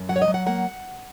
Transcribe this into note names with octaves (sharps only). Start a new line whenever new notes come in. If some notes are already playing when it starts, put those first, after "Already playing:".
Already playing: F#2
F#3 F#5
C#5
D#5
F#3
F#5
A#3 F#5